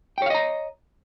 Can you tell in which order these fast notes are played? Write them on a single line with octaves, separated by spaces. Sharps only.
G5 C#5 F5 D#5 A#5